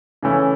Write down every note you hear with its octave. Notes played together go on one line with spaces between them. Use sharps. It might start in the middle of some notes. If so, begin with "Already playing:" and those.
C#3 E3 A3 C#4 E4